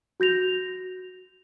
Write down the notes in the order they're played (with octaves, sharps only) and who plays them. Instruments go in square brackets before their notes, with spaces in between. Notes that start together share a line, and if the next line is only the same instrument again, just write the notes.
[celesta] F#4 G6 A#6 F7